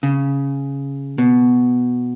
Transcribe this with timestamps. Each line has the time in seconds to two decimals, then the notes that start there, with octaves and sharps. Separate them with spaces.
0.03 C#3
1.18 B2